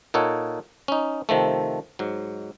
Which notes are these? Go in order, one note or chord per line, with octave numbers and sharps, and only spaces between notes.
A#2 D#4 A4 C#5 F#5
C#4 D#4
C3 D#3 F3 A3
G#2 F#3